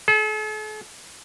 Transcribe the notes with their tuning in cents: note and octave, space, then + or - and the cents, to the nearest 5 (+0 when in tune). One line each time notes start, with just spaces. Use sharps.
A4 -45